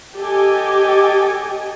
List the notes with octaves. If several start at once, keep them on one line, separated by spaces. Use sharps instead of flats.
G4 A4 D#5 G5 G#5